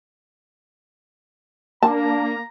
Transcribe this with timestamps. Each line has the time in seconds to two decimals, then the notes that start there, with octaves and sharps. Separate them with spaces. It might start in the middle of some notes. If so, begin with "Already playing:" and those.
1.83 A#3 D4 A5 A#5